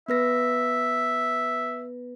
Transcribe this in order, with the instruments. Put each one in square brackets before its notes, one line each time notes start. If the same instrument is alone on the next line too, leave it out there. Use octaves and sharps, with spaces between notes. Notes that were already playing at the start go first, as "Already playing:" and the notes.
[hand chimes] B3 B4 A#6 [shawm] E5